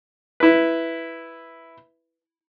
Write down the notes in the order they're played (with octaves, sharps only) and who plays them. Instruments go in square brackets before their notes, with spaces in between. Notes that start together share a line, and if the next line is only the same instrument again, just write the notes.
[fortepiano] E4 B4